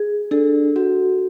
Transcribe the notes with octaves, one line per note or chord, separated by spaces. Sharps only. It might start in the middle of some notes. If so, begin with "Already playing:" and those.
Already playing: G#4
D4 A4
F#4